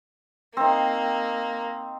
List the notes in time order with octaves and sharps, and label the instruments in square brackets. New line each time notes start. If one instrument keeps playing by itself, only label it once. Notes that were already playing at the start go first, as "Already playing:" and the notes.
[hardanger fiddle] A#3 [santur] C4 D#4